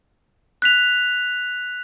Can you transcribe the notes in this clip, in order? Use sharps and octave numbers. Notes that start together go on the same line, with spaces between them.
F#6 B6 F7